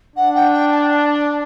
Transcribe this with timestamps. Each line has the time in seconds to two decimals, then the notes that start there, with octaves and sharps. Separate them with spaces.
0.16 D4 F#5
0.35 G5
0.53 G5
0.71 A5
0.90 A5
1.14 A5